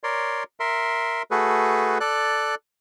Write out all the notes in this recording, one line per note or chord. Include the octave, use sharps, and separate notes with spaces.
A#4 C#5 D5 C6
A#4 E5 C6
A3 F#4 G#4 A4 B4
A4 D5 F#6